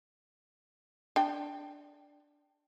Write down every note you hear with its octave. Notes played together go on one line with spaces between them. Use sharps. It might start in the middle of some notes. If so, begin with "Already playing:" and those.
D4 G5